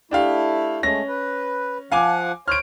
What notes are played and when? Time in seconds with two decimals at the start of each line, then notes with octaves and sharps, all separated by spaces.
0.11 A3 D4 E4 G4 F5
0.83 G#3 A3 C#4 A#6
1.08 B4
1.92 F3 F5 F#5 G#5 D6
2.48 C5 C#5 F6 D7